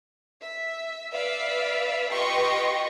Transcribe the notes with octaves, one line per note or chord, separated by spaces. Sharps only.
E5
B4 D5 E5 F5
F4 G4 B4 D#5 C6 C#6